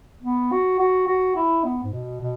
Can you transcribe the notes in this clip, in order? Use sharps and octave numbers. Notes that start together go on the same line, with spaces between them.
B3
F#4
F#4
F#4
E4
B3
G#2
B2
B2